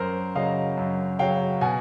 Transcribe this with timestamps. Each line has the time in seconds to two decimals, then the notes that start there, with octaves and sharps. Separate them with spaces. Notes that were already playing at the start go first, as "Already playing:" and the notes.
Already playing: F#2 A#4 C5
0.35 C#3 F#3 D#5 F5
0.77 F#2
1.19 C#3 F#3 F5 G5
1.61 B2 F#5 G#5